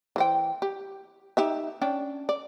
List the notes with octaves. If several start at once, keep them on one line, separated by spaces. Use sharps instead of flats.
E3 C5 G5
G4
D#4 G4 E5
C#4 D4 G5
D5